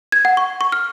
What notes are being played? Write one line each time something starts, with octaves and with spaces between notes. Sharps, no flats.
G#6
F#5
C#6
C#6
F6